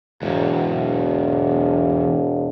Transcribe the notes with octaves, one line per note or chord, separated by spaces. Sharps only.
E1 E2 G#2